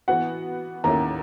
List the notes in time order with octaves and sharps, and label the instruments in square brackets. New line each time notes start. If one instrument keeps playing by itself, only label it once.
[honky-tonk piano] E3 B3 F#4 [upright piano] F#5
[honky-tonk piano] D#2 D#3 A#3 C#4 E4 [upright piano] A#5